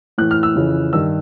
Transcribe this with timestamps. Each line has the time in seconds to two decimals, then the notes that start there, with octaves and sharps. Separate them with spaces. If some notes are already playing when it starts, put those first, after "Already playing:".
0.18 A2 F#6
0.21 E3
0.31 F6
0.43 E6
0.55 F2 C#3 E3
0.93 G2 D#3 E6